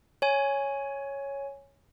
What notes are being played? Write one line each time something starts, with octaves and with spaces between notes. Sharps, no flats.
C#5 G#5